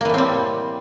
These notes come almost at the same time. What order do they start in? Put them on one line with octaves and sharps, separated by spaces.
A#3 E3 A2 C4 G3